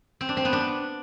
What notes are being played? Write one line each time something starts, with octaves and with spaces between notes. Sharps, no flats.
C4
D4
C4
B3
D4